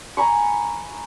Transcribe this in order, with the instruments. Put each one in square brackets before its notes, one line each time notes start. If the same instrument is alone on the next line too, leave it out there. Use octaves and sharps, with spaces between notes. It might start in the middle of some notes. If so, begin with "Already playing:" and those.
[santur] G#5 A#5 B5 C#6